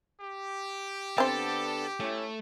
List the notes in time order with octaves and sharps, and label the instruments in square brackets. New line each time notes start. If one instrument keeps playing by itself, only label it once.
[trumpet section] G4
[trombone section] D3 B3 D4 [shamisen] C4 C5 [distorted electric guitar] A4 A5
[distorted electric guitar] A3 [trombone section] C#4 E4